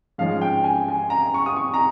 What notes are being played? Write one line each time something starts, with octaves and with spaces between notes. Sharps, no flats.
G#2 F3 G#3 C#4 F5
G5
G#5
G#5
A#5
C#6
D#6
C#6
A#5